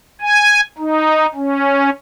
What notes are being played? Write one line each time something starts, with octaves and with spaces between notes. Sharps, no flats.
G#5
D#4
C#4